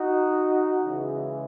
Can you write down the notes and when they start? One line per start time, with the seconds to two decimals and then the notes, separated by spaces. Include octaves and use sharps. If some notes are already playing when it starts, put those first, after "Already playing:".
Already playing: D#4 F#4
0.86 C#3 E3 G#3